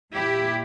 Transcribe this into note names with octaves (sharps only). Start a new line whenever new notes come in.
A#2 E4 G4